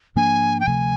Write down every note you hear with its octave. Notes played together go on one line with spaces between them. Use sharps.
G#2 F3 A#3 D4 G#5
G5
D2 C3 F3 A3 G#5